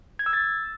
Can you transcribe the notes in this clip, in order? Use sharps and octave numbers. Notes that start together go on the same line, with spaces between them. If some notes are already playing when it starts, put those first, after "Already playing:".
G#6
E6
A6